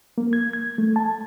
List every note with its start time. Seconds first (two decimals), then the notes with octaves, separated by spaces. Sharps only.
0.18 A#3
0.33 G#6
0.53 G#6
0.78 A3
0.96 A5